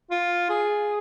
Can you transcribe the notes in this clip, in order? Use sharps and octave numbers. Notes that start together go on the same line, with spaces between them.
F4
G#4